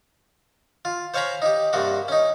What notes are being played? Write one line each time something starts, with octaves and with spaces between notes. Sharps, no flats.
F4
C5 C#5 F5 G#5 A#5 B5
D#4 G4
G2 C3 A#3 F#4
C#4 D#4